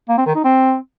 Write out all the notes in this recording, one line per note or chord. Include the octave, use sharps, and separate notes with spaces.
A#3
C4
D#3
D#4
C4